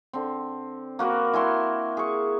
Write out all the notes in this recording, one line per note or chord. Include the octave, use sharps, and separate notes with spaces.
D3 C4
A#3 F#4 A#4 B4
E4 G#5 C6 C#6
G#4 C#6